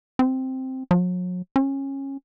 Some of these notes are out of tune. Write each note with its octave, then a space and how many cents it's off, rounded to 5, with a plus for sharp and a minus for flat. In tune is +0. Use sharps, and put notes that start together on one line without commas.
C4 +0
F#3 -40
C#4 -20